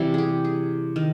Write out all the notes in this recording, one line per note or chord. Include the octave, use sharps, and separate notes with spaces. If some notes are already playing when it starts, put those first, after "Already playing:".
Already playing: C3 E3 G3
G4 G#4
G#4
D#3